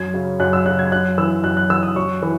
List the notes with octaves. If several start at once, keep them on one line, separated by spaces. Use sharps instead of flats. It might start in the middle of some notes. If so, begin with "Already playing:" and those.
Already playing: F#2 G#6
C#3 F#3
F#2 F#6
E6
C#3 F#3 F#6
G#6
F#2 F#6
E3 E6
F#2 F#6
F#6
E3 E6
D#6
F#2 C#6
E3